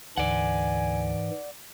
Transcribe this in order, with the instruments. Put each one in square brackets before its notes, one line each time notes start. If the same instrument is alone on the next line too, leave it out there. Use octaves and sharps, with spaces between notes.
[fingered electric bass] D2 [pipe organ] G#2 E3 [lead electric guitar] D5 F#5 [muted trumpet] G#5